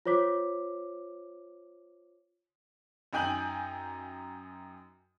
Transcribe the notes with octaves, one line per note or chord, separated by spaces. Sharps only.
F4 C5 C#5 D6 B6
F#2 D#4 G5 G#5 G6 F#7